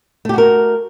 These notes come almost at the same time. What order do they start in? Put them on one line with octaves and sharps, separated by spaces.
A3 G4 F#4 A#4